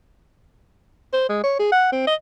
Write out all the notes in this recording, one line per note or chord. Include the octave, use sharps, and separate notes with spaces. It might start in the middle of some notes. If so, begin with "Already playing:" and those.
C5
G#3
C#5
G#4
F#5
C4
D#5